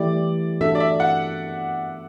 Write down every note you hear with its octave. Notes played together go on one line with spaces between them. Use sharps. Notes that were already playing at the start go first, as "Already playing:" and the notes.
Already playing: E3 A3 E4 G4 D5
A3 D4 F#4 A4 E5
D5
E5
F#5